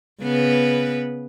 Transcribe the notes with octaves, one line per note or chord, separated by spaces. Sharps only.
C#3 B3 B4